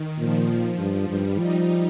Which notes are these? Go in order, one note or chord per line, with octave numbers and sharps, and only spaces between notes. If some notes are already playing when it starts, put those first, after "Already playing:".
Already playing: D#3
A#2 F3
G2 F3
G2 G3
F3 D#4